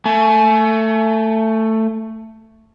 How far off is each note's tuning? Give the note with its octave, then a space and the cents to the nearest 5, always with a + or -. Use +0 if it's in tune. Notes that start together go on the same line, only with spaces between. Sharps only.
A3 +15 G#5 +45